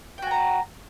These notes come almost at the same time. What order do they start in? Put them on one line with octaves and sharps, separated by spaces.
G5 F#4 G#5 A#5